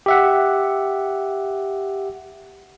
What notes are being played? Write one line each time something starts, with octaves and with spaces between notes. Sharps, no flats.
G4 E5 F#5